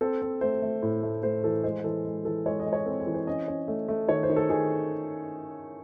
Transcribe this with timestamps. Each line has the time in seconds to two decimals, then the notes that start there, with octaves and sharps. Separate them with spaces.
0.01 C4 A4
0.22 C4
0.41 A3 C5
0.62 A3
0.82 A2
1.03 A3
1.23 A3 C5
1.44 E3 A4
1.63 G#3 C5
1.84 E3 A4
2.05 G#3
2.25 E3 A4
2.46 G#3 C#5
2.59 D#5
2.66 G#3
2.73 C#5
2.86 C4 A4
3.00 G#4
3.06 E3
3.14 C5
3.27 C#4 D#5
3.48 C#4
3.68 A3
3.88 A3
4.09 D#3 C#5
4.23 C5
4.29 D#3
4.36 A4
4.50 D#3 G#4